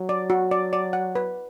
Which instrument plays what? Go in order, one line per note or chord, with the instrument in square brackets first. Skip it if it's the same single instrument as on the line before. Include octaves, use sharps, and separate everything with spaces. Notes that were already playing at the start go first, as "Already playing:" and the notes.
Already playing: [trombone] F#3
[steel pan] D5
F#4
D5
D5
F#5
B4